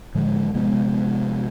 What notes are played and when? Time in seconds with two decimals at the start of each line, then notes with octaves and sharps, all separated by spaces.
0.15 A2 D3 F3 G#3
0.54 C3 F3 G#3 B3